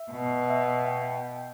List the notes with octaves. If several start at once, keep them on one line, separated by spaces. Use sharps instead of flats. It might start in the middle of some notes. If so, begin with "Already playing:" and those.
Already playing: E5
B2
E5
G5